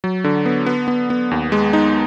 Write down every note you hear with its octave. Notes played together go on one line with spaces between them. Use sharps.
F#3
D3
B3
B3
B3
B3
D#2
G#3
D#4